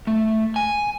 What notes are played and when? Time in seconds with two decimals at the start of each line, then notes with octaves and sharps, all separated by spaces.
0.07 A3
0.56 G#5